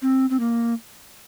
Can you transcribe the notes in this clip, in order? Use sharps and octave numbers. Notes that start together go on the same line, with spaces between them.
C4
C4
A#3